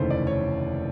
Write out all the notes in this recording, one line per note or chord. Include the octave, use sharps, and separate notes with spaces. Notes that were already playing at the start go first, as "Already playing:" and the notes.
Already playing: F1 D#2 C#3 E3 A3 C5
D5
C#5